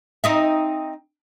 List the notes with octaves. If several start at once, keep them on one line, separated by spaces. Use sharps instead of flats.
C4 D#4 E5